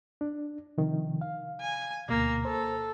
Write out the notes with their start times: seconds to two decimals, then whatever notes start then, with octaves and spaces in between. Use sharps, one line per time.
0.21 D4
0.78 C3 D#3 F3
1.21 F5
1.62 G#5
2.09 D2 B2 A#3
2.45 A4 C5